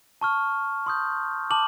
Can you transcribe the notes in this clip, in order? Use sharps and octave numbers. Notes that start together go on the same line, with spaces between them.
A5 C#6 F6
C6 D#6 G6
A5 D6 F6 F#7